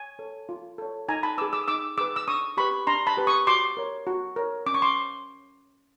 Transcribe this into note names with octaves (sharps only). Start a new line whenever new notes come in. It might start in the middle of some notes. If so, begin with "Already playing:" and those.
Already playing: G#5
A4 C#5
F4
A4 C#5
D#4 G#5 A#5
A5 B5
G#4 B4 D6 E6
D6 E6
D#6
D#4 D6 E6
G#4 B4 D6 E6
E6
D4 C#6 D#6
G4 B4 B5 C#6
D4 A#5 C6
A5 B5
G4 B4
C#6 D#6
F#4 C6 D6
A#4 C#5
F#4
A#4 C#5
C#4 D6
C#6
C6 D6